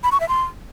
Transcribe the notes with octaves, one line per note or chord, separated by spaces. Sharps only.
B5
C#6
E5
C6